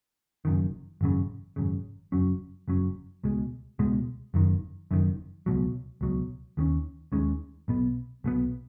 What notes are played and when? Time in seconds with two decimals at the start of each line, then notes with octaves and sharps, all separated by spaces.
0.45 F#1 F#2 D#3
1.01 G#1 F#2 C#3
1.56 G#1 F#2 C#3
2.12 F#1 F#2 F#3 C#4
2.68 F#1 F#2 F#3 C#4
3.24 C#2 B2 G#3
3.79 C#2 B2 G#3
4.34 F#1 F#2 D#3
4.91 F#1 F#2 D#3
5.46 C#2 B2 F#3
6.01 C#2 B2 F#3
6.57 D#2 D#3 G#3 C#4
7.12 D#2 D#3 G#3 C#4
7.68 B1 B2 B3
8.24 B1 B2 B3